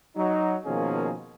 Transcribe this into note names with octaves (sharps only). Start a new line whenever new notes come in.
F#3 D#4
B2 D#3 F3 A#3 C#4 G#4